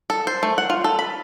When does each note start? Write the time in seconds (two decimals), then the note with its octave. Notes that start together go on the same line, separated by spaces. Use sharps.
0.10 A4
0.27 C5
0.43 A3
0.58 F#5
0.70 F4
0.84 A4
0.99 B5